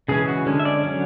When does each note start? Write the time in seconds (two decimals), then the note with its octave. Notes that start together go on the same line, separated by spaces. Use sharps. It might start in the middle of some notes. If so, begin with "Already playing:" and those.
0.08 C#3 E3 G#3 C#4 G#4
0.28 F#4
0.46 D3 G#3 C#4
0.60 E5
0.65 D5
0.84 D3 F#3 C#4